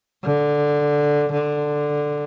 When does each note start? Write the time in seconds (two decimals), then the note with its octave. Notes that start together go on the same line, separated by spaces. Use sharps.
0.24 D3
1.31 D3